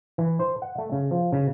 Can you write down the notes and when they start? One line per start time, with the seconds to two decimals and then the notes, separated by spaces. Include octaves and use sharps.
0.18 E3
0.40 C5
0.62 F#5
0.78 A3
0.92 C#3
1.11 F3
1.32 C#3